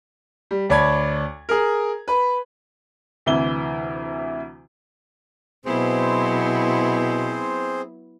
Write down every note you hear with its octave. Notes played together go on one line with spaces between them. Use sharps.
G3
D2 C#5 D5 A5 B5 G#6
G#4 A#4
B4 B5
D2 C3 E3 E4 G7
B2 F#3 B3 C4 E4 G#4 C5